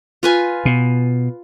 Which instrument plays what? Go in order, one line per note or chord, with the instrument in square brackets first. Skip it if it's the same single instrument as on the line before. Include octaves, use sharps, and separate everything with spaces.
[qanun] F4 B4 G#5
[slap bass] B2